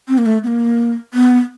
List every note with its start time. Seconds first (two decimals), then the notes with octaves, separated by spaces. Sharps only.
0.08 C4
0.18 A#3
0.26 A3
0.44 B3
0.47 A#3
1.14 B3